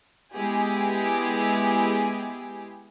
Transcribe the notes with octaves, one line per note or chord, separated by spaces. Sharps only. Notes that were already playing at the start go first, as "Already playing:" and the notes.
G#3 B3 E4 G4 G#4